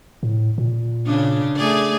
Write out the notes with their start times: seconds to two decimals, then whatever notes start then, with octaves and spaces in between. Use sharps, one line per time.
0.23 A2
0.58 A#2
1.06 C#3 D4
1.56 A3 G#4 D5